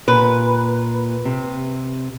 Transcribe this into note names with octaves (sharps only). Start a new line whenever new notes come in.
A#2 B4
C3